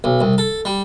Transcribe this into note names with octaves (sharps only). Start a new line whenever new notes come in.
B1
C2
A4
G3